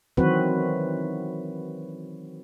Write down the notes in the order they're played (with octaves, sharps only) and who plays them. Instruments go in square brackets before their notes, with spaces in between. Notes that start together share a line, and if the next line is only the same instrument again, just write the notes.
[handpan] D#3 E3 F#3 C4 F#4 B4